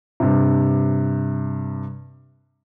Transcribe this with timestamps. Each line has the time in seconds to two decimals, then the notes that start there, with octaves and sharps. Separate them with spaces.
0.20 G2 C3